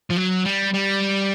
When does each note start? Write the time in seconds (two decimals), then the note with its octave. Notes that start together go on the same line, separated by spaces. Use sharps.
0.11 F3
0.17 F#3
0.46 G3
0.74 G3